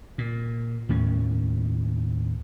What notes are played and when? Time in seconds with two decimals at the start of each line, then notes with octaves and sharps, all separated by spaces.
0.18 A#2
0.89 D#2 A2 C#4